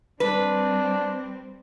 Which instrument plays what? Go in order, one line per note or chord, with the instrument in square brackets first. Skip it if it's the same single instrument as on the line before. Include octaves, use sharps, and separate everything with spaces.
[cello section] G3 C4 [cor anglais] D4 [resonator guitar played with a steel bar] B4